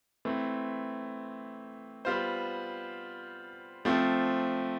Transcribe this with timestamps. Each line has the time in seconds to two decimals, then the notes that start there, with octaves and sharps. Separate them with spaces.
0.25 E3 A3 C4
2.05 G3 B3 F4 C5
3.85 F3 A3 C4